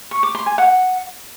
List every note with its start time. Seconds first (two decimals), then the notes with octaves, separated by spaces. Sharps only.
0.11 C#6
0.23 D6
0.35 C6
0.46 G#5
0.58 F#5